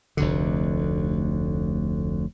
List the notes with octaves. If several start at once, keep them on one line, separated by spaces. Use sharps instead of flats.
F1 D2 D3